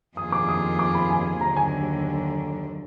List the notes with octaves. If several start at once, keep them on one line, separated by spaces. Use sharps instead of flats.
F2 D#3 A#3 F4 G#4 D#6
D6
D#6
D6
B5
G#5
D#2 D3 F#3 A#5
G#5